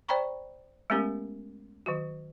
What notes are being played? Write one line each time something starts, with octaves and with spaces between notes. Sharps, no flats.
C5 D5 G5 A#5 B5 C#6
G#3 A3 B3 C#4 G4 A#4
D#3 F#3 F#4